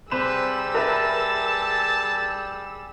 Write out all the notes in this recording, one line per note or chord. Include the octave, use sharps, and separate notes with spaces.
C3 G3 G#4 B4 C5 E6 E7
A#4 B4 E5 A5